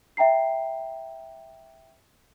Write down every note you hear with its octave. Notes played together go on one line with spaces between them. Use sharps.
E5 G5 A#5 C7